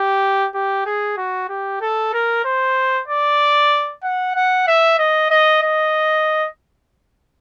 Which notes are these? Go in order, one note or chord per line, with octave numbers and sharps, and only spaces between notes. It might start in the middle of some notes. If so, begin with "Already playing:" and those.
Already playing: G4
G4
G#4
F#4
G4
A4
A#4
C5
D5
F#5
F#5
E5
D#5
D#5
D#5